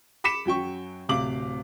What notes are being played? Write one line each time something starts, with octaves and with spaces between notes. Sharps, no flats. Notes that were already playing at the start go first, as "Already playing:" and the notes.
B5 D6 B6 C#7 E7
F#2 F#3 G5 C#6
D1 C3 F5 D6 F#7